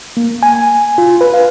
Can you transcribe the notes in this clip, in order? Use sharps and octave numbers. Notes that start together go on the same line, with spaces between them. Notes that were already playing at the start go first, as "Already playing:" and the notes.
A#3
G#5
F4
B4
F5